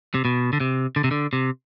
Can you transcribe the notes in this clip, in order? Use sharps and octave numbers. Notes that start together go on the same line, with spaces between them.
C3
B2
D3
C3
D3
C3
D3
C3